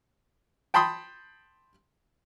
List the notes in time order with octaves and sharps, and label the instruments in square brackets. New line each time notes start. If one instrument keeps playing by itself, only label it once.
[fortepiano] G5 A5 B5 C6 D#6